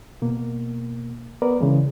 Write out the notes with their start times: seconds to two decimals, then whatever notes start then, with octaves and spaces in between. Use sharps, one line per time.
0.22 B2 A#3
1.42 B3 A#4 B4 D5
1.60 C#3 E3 G#3